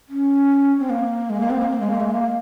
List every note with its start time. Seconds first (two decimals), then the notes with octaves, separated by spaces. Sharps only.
0.09 C#4
0.79 C4
0.90 A#3
1.30 G#3
1.40 A#3
1.50 C4
1.60 A#3
1.71 A#3
1.80 G#3
1.91 A#3
2.00 G#3
2.11 A#3